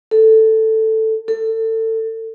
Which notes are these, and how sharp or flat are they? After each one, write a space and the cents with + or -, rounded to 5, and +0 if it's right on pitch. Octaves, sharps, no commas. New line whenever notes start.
A4 +5
A4 +25